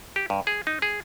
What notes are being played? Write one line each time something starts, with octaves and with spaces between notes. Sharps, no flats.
G4
G2
G#4
D#4
G#4